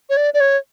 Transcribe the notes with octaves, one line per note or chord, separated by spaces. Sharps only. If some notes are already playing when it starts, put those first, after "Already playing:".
C#5
D5
D5
C#5